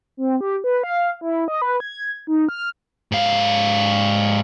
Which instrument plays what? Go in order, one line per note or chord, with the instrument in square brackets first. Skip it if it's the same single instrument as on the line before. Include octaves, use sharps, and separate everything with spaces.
[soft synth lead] C4
G4
B4
F5
E4
D#5
B4
G#6
D#4
F6
[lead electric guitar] G#2 F5